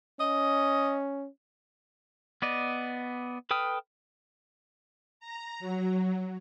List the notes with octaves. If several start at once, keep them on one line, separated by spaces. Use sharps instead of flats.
C#4 D#5
B3 D5 D#5
A4 B4 G5 D#6 F6
A#5
F#3